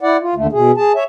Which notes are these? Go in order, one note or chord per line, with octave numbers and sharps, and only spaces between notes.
E4 D5 F#5
F4
D#2 D3 A3
B2 G#4
G#4 A5
C#5 E5